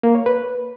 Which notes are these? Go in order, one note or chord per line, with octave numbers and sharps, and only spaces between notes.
A#3
C#5
B4